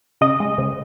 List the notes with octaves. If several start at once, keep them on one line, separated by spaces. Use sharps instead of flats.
C#3 D#5
G#3
C#3